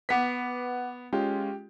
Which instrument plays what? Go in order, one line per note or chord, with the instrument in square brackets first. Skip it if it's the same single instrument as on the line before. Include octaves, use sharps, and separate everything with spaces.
[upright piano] B3 B6 [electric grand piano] B4 F#5 D6
[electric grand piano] G#3 C#4 F4 [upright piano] G4